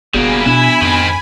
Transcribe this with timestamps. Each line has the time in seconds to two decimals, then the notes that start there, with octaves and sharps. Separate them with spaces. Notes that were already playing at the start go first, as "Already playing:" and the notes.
0.14 F#1 G3 A#3 B3 F#4 G#4 G#5 B5
0.46 B2 B3 D4 E4 F#4
0.82 F2 D#3 C4